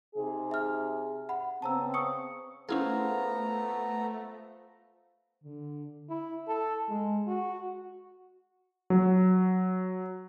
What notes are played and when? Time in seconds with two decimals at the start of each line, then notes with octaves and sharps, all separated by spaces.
0.15 C3 D#4 G#4
0.51 E5 F6
1.29 F#5 B5
1.62 C#3 B3 C4 A5 A#5 E6
1.94 C#6 D#6 C#7
2.69 A3 B3 C#4 E4 F4 G#4 C5 A#5
5.44 D3
6.09 E4
6.48 A4
6.89 G#3
7.27 F#4
8.90 F#3